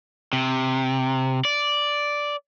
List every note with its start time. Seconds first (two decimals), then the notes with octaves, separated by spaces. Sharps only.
0.33 C3
1.45 D5